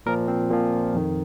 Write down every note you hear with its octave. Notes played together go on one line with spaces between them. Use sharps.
A#2 F3 A#4
C4
A#2 F3
F2 D#3